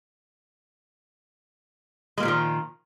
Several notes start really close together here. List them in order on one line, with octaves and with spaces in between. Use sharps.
G#3 A#3 A#2 F3 D#3